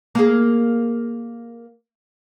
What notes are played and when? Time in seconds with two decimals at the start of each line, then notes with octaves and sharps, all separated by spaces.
0.15 A#3 G#4